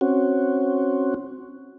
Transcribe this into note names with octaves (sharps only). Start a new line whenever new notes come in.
C4 C#4 F#4